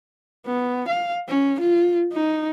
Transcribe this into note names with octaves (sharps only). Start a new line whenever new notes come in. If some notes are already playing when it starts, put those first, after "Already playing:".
B3
F5
C#4
F4
D#4